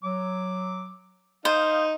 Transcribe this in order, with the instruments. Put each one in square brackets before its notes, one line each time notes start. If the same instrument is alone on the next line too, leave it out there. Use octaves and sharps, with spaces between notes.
[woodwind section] F#3 [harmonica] D6
[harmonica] D#4 [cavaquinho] C5 [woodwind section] F5 D#6